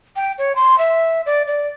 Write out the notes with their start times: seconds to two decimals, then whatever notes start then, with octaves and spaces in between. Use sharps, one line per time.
0.16 G5
0.38 C#5
0.56 C6
0.78 E5
1.26 D5
1.47 D5